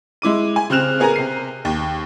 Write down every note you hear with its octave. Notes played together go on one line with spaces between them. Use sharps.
G#3 E4 D6 D#7
G#5
C#3 C4 F6 F#6 E7 F7
B3 G#4 A#4 G#5 A#5
C3 C7 D#7
D#2